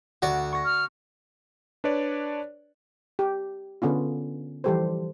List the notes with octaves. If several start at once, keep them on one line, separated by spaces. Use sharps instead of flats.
D2 F#4 D5
C#6 A#6
F6
D4 B4 C#5 D5
G4
D3 B3 C#4 F4
E3 F3 G3 G4 A4 C5